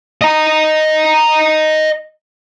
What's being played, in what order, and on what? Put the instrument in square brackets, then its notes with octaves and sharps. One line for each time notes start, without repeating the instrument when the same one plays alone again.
[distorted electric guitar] D#5 A#5